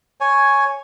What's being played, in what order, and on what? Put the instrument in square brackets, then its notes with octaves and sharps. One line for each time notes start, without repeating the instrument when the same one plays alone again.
[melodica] C#5 G#5